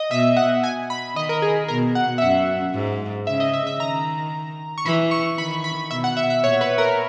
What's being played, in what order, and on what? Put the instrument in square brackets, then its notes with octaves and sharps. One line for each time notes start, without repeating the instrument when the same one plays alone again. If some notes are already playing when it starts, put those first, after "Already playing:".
Already playing: [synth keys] D#5
[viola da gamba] B2 [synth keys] E5
[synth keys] F#5
G#5
B5
[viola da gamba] D#3 [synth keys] D#5
[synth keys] A#4
G#4
[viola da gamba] B2 [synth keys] A#4
[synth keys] F#5
E5
[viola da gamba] F#2 [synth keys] F#5
[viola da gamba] G#2
[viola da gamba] C#3 [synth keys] E5
[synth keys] D#5
E5
E5
[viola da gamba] D#3 [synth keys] A#5
[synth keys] C#6
[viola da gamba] E3 [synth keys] B5
[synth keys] C#6
[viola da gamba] D#3 [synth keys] B5
[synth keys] B5
[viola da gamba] B2 [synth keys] E5
[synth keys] F#5
E5
E5
[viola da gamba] A#2 [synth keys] C#5
[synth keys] B4
A#4